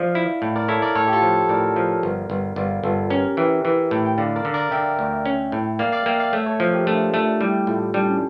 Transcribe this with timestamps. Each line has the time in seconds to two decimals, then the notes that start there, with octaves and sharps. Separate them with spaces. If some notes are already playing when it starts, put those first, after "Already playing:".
Already playing: F3 D5 F5
0.15 E4
0.42 A2
0.56 A#4 D5
0.68 E4 A4 C#5
0.82 A#4 D5
0.95 A2 A4 C#5
1.07 G4
1.13 F4 A4
1.22 F3
1.49 A2 A#4 D5
1.76 F3
2.03 G1
2.30 G1
2.56 G1 D5 F5
2.84 G1 F4 A4
3.10 C#4 G4 A#4
3.37 E3 E5 G5
3.65 E3
3.91 A2
4.05 G5
4.18 D3 D5 F5
4.36 A#4 D5
4.45 D3
4.54 A#4 D5
4.71 D3 E5 G5
4.99 D2
5.26 C#4
5.52 A2
5.79 A#3 D5 F5
5.92 D5 F5
6.06 A#3 E5 G5
6.20 D5 F5
6.33 A3 C#5 E5
6.46 A4 C#5
6.60 F3
6.74 G4 A#4
6.86 A3 D4 F4
7.00 D4
7.14 A3 D4
7.27 D4
7.40 G3 E4 G4
7.67 A2 F4 A4
7.94 G3 D4
8.07 C#4